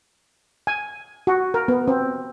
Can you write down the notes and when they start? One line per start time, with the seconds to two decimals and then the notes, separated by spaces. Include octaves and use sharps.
0.67 G#5
1.27 F#4
1.54 A#4
1.68 B3
1.88 C4